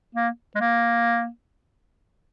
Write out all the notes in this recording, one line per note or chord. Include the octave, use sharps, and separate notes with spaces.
A#3
G#3
A#3